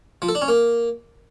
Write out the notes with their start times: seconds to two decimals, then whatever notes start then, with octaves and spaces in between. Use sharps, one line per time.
0.22 F3
0.29 A4
0.35 D4
0.42 C#4
0.48 A#3